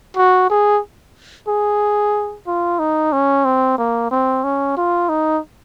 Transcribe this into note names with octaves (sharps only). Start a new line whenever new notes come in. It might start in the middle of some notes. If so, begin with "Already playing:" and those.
F#4
G#4
G#4
F4
D#4
C#4
C4
A#3
C4
C#4
F4
D#4